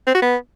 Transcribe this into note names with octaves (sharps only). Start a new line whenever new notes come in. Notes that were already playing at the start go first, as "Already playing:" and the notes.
C4
F#4
B3